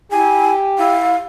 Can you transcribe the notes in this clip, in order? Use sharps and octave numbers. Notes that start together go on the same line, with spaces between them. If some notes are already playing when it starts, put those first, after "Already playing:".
E4 G4 G#5
E4 F5